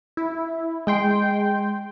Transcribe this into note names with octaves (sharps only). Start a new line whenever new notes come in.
E4
G#3 G5 C6